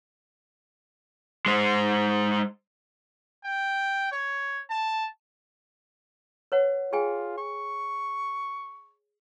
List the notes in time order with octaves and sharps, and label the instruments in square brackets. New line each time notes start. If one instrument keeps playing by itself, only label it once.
[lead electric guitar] G#3 C5
[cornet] G5
C#5
A5
[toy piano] B4 C#5 F#5
[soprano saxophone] F4 [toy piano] G#4 G5 G#5
[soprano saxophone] C#6